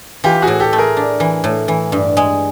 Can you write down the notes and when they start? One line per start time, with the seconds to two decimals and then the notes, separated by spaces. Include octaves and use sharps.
0.24 E3 F4 G4
0.42 F#4 G#4
0.47 A2
0.60 G4 A4
0.73 A3
0.78 G#4 A#4
0.97 D4
1.20 E3
1.44 A2
1.68 E3
1.92 G2
2.17 G#3